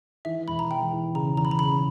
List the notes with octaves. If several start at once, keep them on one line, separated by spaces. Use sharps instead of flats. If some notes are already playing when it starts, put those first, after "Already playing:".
E3 E5
E1 B5
A#5
E2 G5
E3
C#3 A#5
E2 A#5
B5
A#5
C#3 B5